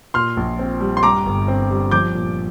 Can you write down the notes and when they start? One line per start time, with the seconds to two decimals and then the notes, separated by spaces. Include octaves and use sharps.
0.14 A#2 C6 F6
0.37 A#1
0.59 C4
0.81 G3
0.97 C6
1.03 G2 A#5 D6
1.26 G1
1.48 C4
1.70 G3
1.91 F3 D6 G6
2.15 A#2